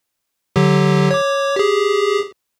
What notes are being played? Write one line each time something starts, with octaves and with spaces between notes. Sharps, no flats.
D3 F#3 G4
C#5 D6
G4 G#4